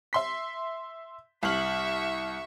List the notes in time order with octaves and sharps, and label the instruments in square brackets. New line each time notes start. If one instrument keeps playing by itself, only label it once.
[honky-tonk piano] E5 C6 B6
[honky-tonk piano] C2 F6 F#7 [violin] E5 C#6